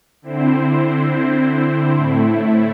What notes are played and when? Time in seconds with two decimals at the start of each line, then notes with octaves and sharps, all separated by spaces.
0.22 D3 C4 E4 C5
1.95 A2 A3 E4